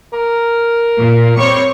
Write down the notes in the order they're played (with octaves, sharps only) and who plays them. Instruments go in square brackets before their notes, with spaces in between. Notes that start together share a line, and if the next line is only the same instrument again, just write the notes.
[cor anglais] A#4
[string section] A#2
[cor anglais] G3 [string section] C4 C#5 C#6